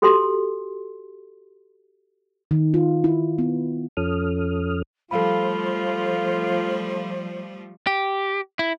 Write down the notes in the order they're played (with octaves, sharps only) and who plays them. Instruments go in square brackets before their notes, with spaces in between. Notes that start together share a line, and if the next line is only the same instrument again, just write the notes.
[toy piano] F#4 G4 A4 G#5 C6
[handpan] D#3
F4
E4
B3
[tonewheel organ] F2 F3 C#4 A4 D#6 F6
[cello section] F3 G3 A3 [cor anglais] F4 [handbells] A4 F5 B5 [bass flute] C5
[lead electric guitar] G4
E4